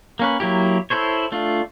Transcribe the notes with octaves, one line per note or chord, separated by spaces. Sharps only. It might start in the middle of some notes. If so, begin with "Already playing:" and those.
A#3 C#4 B4
F#3 A#3 E4 G4
E4 A4 C5 C#5
A3 D4 F4